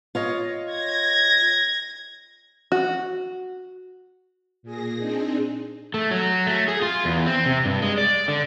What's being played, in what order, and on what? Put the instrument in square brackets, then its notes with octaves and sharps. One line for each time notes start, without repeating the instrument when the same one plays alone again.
[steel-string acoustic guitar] F4 C#5 D#5
[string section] G#6 A#6
[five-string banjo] F#4
[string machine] A#2 G#4 A#6
C4 D4 D#4 G#4
[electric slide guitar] A3
F#3
A3
G#4
F4
E2
C4
C3
G2
G#3
D5
D3